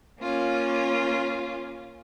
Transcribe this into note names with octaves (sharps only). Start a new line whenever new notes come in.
A#3 C#4 F4